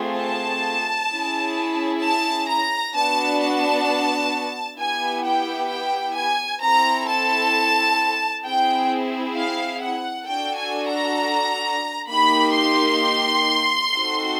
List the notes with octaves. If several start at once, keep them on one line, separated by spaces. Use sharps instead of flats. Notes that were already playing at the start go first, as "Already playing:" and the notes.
Already playing: A3 C4 F4 G#4
A5
C#4 E4 G#4
A5
A#5
B3 D4 F#4 A5
A5
B3 E4 G4 G#5
G5
G5
G#5
C4 E4 A4 A#5
A5
C4 E4 G#4 G5
F5
F#5
D4 F#4 A4 G5
G#5
A#5
A#3 D#4 G4 B5
C6
C4 D#4 F#4 A4